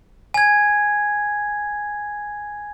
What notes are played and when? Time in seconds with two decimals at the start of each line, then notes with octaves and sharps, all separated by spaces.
0.34 G#5 G#6